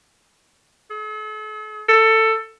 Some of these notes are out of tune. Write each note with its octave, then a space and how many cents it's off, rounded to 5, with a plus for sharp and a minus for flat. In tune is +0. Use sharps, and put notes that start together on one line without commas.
A4 -45
A4 +15